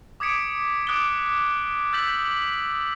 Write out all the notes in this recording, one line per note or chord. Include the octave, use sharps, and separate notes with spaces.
D6 D#6 G#6 B6 C#7 D7
D6 D#6 F#6 A6 D7 G7
E6 G6 A6 B6 F#7